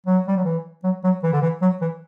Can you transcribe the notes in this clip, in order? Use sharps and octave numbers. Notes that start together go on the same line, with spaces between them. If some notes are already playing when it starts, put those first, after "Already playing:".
F#3
G3
F#3
E3
F#3
F#3
E3
D3
E3
F#3
E3